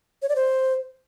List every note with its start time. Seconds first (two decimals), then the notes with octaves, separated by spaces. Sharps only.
0.22 C#5
0.29 D5
0.36 C5